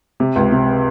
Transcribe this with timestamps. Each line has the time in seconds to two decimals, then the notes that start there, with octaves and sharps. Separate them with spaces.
0.20 C3
0.36 C#2
0.52 C3